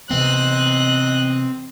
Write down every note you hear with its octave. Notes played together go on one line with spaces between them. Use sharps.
C3 E3 B3 C4 D#5 F#6